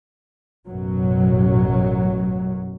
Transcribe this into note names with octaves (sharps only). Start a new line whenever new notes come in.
A1 F#2 B2 F#3